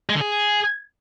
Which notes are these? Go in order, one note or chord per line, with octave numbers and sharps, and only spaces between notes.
G#3
D3
G#4